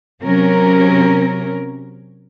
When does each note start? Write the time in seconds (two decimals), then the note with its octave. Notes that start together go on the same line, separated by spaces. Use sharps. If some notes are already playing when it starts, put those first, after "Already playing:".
0.23 C3 F#3 C#4 A#4